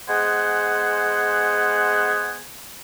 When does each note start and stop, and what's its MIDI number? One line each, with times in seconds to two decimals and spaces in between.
0.08 2.42 56
0.08 2.42 59
0.08 2.42 72
0.08 2.42 78
0.08 2.42 80